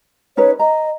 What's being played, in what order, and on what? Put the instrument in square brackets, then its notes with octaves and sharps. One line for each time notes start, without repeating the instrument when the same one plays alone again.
[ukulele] C#4 D#4 B4 [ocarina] C#5
[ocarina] D#5 [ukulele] A#5